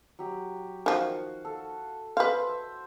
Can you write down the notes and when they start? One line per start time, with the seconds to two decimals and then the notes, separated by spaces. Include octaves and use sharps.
0.19 F#3 G4
0.86 D#3 F3 F#4 F5
1.45 A4
2.17 B4 C5 E5 F5
2.49 E5